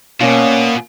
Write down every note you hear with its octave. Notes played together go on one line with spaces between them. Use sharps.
B2 A#3 C#4 F4